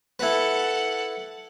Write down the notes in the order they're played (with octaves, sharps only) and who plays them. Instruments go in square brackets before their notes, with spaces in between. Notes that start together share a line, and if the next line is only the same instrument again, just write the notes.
[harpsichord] E4 B4 [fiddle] A4 F#5